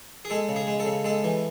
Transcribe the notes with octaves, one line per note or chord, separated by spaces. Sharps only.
G#4
G#3 A4
C#3
G#4
G#3
A4
C#3
G#3 A4
E3